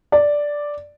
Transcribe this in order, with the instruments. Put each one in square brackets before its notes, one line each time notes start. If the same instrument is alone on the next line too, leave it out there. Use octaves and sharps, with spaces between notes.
[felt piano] D5